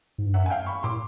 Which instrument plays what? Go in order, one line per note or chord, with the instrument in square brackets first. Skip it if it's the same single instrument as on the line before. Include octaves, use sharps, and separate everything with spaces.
[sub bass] G#2
G2
[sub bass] F#2 [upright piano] E5 F#5
[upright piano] G#5
F5 G5
B5 C#6
[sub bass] A2 [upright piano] C6 D6